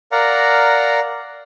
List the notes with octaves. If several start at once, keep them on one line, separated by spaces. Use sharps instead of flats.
A#4 D5 F5 F#5 A#5